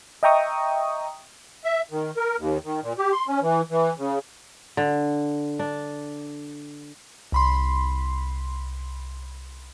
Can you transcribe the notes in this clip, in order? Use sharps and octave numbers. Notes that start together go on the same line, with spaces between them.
D#5 E5 G5 A#5 C#6 D#6
E5
D#3
A#4
D#2
D#3
A#2
G4
C6
C#4
E3
E3
C#3
D3
D4
C2 B5 C6